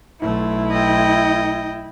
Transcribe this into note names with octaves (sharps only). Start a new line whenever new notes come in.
B1 A3 E4
D#5 G5